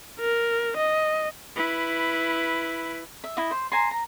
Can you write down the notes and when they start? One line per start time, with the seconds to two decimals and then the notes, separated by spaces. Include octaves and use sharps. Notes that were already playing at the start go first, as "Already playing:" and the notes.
0.20 A#4
0.77 D#5
1.56 E4 B4
3.24 E5
3.37 E4 D#5
3.51 C5
3.72 C5 G#5 A#5 C6
3.91 A#5